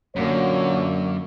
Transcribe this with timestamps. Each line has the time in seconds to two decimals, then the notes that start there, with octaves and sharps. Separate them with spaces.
0.16 F#2 A#2 D3 F#3 A#3 C#5